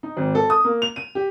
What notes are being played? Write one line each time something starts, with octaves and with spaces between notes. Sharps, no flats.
D#4
G#1
A4
D#6
A#3
F7
D#7
G4